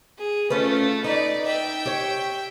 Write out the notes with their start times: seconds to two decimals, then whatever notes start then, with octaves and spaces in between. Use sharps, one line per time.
0.18 G#4
0.50 A3 C#4 F4 B4
1.04 D#4 B4 D5
1.45 E5 G5
1.86 G4 C#5